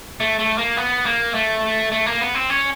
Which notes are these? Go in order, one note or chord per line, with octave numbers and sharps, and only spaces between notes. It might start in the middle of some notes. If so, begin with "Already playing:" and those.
A3
A3
A#3
B3
A#3
A3
A3
A#3
B3
C4
C#4